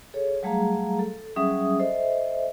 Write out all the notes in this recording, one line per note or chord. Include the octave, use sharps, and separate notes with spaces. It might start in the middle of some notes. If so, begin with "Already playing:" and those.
G#4 A4 C#5
F#3 G3 A3 G#4 F5 A#5
A4
F#3 G3 C#4 G#4 E5 D#6
A4 C5 D#5 E5